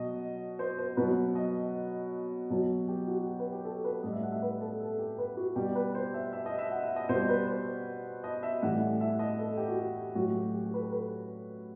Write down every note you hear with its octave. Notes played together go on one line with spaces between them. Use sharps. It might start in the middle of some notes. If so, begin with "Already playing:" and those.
Already playing: B2 F#3 D#5
C5
C5
B2 F#3 B4
D#5
B2 F#3
G4
F#4
G4
B4
G4
A4
B4
A2 G3 D#5
E5
F#5
E5
B4
A4
A4
G4
B4
F#4
B2 G3 G4
B4
C5
E5
E5
D#5
E5
F#5
E5
D#5
B2 G3 C5
B4
C5
D#5
E5
A2 E3 G3 F#5
E5
D#5
A4
G4
F#4
G4
A2 F#3 F#4
G4
G4
G4
B4
A4
B4